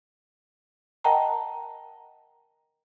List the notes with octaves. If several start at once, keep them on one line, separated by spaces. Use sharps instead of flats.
A#4 D#5 F#5 G5 A5 A#5